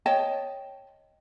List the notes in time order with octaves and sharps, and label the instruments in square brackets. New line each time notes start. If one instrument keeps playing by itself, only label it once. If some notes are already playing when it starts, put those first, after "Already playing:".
[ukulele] C#5 D#5 G5 A5